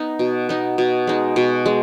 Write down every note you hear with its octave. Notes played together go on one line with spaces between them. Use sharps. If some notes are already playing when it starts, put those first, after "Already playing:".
Already playing: B3 D#4
B2
B3 D#4
B2
G#3 D#4
B2
G#3